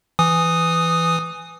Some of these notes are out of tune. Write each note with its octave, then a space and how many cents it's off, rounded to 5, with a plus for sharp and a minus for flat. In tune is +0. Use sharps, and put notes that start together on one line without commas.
E3 +15 G#5 +0 D#6 +0